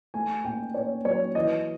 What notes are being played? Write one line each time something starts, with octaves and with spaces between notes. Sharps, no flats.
A3 G#5
A#2 G5
A#2 C#5
F#3 C#5
E3 D#5